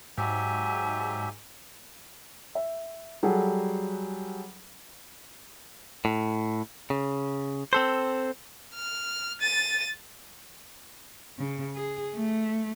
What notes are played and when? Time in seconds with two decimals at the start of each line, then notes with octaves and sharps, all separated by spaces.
0.18 G#2 F#3 G4 E5 G#5
2.55 E5
3.23 F#3 G3 G#4 A4 F#5
6.05 A2
6.90 C#3
7.73 C4 A4 C5
8.75 F6
9.41 A6 D#7
11.39 C#3
11.75 G#4
12.16 A3